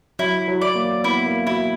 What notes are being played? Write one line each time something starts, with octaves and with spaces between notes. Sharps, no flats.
F#3 E4
F#3
D5
A#3
B3 E4
A#3
E4 F#4